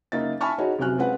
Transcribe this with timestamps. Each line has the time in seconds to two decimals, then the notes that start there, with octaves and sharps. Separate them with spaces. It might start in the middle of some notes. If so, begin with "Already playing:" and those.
0.12 F#1 A#3 D#4 E5 A6
0.41 E5 G#5 A5 B5 C#6 F6
0.58 D#4 F#4 G#4 C#5
0.79 F1 C3 F#3 G#5 F6 F#6
0.98 G#3 C4 C#4 F4 B4 F#5